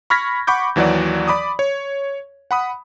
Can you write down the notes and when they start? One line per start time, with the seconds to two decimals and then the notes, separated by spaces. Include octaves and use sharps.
0.10 B5 C#6 F6 G#6 A#6 B6
0.47 F#5 B5 C#6 D6 G6
0.76 D#2 E3 F#3 F#4 D5
1.28 D5 B5 D6 D#6
1.59 C#5
2.51 F#5 B5 D#6